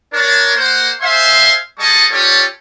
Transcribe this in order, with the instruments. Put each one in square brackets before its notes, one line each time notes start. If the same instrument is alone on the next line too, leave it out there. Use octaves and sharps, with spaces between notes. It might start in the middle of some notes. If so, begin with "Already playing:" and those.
[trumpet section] D4 A#4 C#5
A#3 C5 F#5
C5 E5 F5 G#5 C6
G3 G#4 D#5 A5 A#5 C#6
C#4 F4 G4 A4 C#5 D5